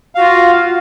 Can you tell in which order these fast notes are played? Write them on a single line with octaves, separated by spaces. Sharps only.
F5 F#4 F4